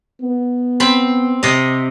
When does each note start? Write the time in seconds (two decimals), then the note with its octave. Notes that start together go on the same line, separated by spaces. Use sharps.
0.22 B3
0.80 C4 B5
1.43 C3 D#5